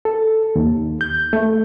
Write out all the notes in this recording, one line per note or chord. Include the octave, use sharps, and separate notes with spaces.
A4
D#2
G6
A3